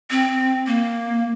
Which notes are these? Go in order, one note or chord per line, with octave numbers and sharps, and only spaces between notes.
C4
A#3